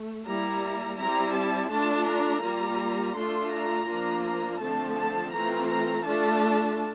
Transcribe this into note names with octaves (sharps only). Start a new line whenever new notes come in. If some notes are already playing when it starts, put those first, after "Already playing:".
Already playing: A3
G3 A#3 E4 A#5
G3 C4 E4 A#5
A5
A3 D4 F4 A5
A#5
G3 A#3 F4
A3 D4 F4 C6
A#5
F3 A#3 D4 F4
A#5
D3 F3 A3 C4 A5
A5
E3 A3 C4 F4 A#5
A#5
A3 D4 F4 A5